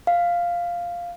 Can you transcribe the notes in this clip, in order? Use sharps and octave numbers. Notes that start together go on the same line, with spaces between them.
F5